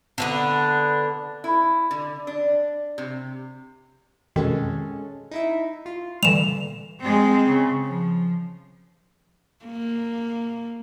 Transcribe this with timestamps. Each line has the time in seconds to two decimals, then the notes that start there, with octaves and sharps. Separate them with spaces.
0.18 D3 B3 D4
1.44 E4
1.91 D3
2.27 D4
2.98 C3
4.36 F2 B2 D#3 G#3 C#4 A4
5.31 D#4 E4 E5
5.86 F4
6.23 A#2 D3 E3 G3 E7 F7
7.00 G#3 C4
7.48 C#3
7.85 F3
9.65 A#3